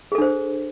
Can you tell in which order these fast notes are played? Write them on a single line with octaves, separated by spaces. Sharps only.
G#4 A4 D4 C5